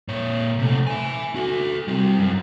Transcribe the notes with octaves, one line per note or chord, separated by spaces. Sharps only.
A#2 C#5
C3 A3
E5 G#5
F#4 A4
G3 C4
F#2